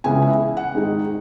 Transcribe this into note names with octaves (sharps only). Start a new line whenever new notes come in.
C#2 C#3 E3 B3 E4 G#5
E5
F#5
G#2 D#3 G#3 D#4